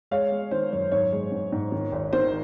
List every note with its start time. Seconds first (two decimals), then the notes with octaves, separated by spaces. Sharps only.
0.11 G#3 C#5 F5
0.32 G#3
0.51 D#3 C5
0.73 F#2 C#5
0.92 G#2 C#5
1.12 G#3
1.32 G#2
1.52 G#2
1.72 D#3
1.92 G#1
2.13 D#3 C5